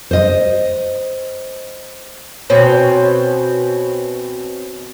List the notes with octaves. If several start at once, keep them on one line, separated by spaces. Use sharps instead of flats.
C5 D#5
B2 C4 C#4